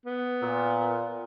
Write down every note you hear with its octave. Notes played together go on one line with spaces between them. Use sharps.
B3
A#2